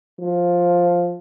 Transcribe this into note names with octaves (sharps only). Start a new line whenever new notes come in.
F3